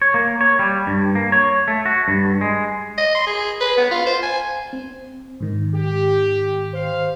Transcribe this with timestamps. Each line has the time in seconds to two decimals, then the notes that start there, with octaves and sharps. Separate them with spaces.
0.02 C#5
0.14 A#3
0.41 C#5
0.59 G3
0.87 G2
1.15 A#3
1.32 C#5
1.68 A3
1.86 F#4
2.08 G2
2.41 G#3
2.98 D#5
3.15 C6
3.27 G#4
3.61 B4
3.77 B3
3.91 F4
4.06 C5
4.23 G#5
4.73 C4
5.40 G#2 D#3
5.75 G4
6.74 C5 F5